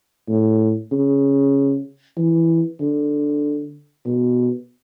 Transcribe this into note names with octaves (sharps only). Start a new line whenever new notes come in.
A2
C#3
E3
D3
B2